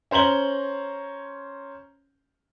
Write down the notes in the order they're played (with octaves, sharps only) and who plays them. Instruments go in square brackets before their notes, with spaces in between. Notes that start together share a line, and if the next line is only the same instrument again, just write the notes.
[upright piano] C#4 C5 A#5 F#7 G7